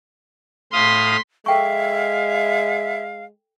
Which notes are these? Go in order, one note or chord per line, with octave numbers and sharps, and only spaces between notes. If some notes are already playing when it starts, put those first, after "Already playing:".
A2 F5 C6 D#6 B6
G#3 A4 E5 F5 G5 C#6